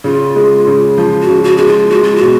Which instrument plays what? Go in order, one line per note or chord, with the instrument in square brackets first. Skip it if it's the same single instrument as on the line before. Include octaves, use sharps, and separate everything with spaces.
[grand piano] C#3 [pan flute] F4
[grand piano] G#3
C#3
[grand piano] F3 [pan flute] F4
[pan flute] F#4
[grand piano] C#3
[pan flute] F#4
[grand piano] G#3 [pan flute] F#4
[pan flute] F4
[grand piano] G#3 [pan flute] F#4
[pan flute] F4
F#4
[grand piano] B2